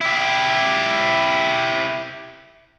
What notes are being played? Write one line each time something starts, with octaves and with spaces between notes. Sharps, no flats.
E4 G4